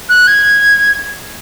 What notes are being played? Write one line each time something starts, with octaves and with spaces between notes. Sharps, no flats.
F#6
G#6